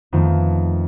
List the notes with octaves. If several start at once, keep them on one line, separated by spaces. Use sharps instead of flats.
F2 D#3 A3 B3 F4